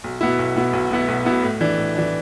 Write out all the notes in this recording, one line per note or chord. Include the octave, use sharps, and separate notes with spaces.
B1
B2 B3 E4
B1
B2 B3 E4
B1
B2 B3 E4
B1
B2 B3 E4
A2
E3 D4
A2
E3 D4